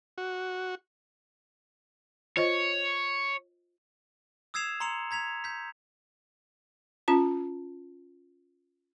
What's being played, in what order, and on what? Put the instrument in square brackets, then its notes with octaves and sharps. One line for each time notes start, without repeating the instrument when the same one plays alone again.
[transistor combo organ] F#4
[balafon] F4 C5 D#5 [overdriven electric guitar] C#5
[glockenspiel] D#6 E6 G#6 C7 E7 F7
A#5 C6 C#7 F7
A#5 G#6 B6 F7
G6 B6
[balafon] C#4 F4 A5